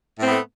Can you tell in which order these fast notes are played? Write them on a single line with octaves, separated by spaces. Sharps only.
A2 C4 B3 A3